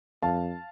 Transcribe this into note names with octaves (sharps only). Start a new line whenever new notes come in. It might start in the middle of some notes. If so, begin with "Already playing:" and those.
F2 F5 A5